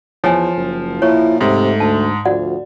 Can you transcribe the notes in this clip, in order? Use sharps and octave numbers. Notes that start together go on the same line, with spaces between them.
E2 F3 C#5 G#5
F#1
A#2 E4 C#5 C#6
G#2 C3 A3
D2 A5
D2 F3 F#4 D5 F#5